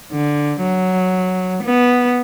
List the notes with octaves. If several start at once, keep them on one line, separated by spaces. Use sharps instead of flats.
D3
F#3
B3